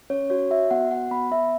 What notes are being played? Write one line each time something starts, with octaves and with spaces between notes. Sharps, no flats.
C#4 C#5
F#4 C#5
F#4 E5
B3 F#5
F#4 F#5
B3 B5
B3 E5